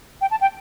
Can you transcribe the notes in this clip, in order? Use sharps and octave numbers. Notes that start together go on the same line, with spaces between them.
G5
A5
G5